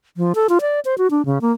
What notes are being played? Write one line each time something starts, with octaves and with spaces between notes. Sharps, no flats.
F3
A4
F4
D5
C5
F#4
D4
C#3
A#3